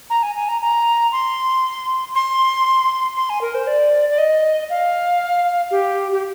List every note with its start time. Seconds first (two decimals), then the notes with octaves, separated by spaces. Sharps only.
0.10 A#5
0.23 G#5
0.36 G#5
0.49 A#5
0.61 A#5
1.12 C6
2.15 C6
3.17 C6
3.30 G#5
3.41 A#4
3.55 C5
3.67 D5
4.09 D5
4.18 D#5
4.70 F5
5.71 G4
6.12 G4